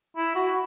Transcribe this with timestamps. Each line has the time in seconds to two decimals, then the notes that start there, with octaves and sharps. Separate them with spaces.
0.17 E4
0.35 F#4